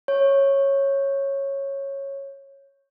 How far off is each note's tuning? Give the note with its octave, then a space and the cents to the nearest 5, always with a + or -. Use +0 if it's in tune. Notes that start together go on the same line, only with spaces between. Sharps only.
C#5 -10